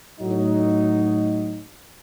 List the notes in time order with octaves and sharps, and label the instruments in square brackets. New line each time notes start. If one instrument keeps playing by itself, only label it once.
[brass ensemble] A2 F#3 D#4